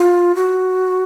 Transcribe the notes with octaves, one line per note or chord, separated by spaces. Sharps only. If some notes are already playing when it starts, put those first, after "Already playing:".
Already playing: F4
F#4